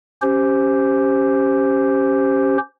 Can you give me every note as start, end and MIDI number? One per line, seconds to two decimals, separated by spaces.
0.22 2.58 61
0.22 2.58 67
0.22 2.58 72